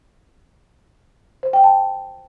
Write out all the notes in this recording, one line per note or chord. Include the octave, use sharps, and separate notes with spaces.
C5
G5
A5